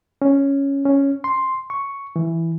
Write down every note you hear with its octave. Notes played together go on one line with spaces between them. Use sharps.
C#4
C#4
C6
C#6
E3